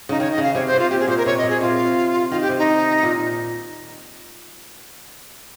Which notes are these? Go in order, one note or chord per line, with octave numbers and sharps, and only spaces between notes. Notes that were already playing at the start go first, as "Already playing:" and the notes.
C#3 D#4
D#3 C#5
D#5
C#3
F5
C3 C#5
C5
C3
F4
A#2 G4
G#4
A#2 C5
A#4
C3 C#5
D#5
A#2
G#4
C3 F4
D#3 F4
G4
C3
D#4
A#2